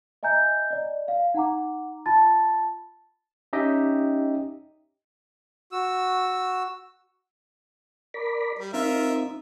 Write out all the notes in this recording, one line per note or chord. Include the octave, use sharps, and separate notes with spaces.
D#5 E5 G#5 A#5 G6
D5 D#5
F5
D#4 F#5 A#5 D6
F4 A5 B5 A6
C#4 D#4 G4 D#5 E5 G5
F#4 E6
A#4 D5 B5
G3
C4 D#4 F4 A#4 E5